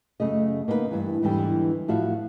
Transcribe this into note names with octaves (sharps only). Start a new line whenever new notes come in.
F#2 C#3 A3 D#5
A#3 B3 D#4 G#4 B4
G2 E3
E2 G#2 D3 E3 G3 G5
A2 F3 F#4 E5 F5